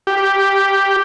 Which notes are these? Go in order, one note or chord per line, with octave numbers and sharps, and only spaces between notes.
G4